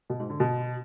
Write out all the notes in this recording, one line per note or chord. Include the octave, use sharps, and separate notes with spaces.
B2
G#2
D3
B2